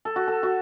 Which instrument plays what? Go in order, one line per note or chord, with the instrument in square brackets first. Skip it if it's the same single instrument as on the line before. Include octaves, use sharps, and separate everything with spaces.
[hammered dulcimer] A4
F#4
A4
F#4